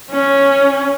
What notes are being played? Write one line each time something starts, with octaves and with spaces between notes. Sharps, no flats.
C#4